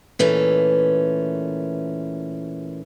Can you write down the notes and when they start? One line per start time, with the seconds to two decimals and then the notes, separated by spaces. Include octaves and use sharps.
0.19 A#2 E3 A3 C#4